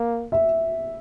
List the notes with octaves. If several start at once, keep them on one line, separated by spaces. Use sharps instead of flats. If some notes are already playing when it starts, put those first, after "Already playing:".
Already playing: A#3
E5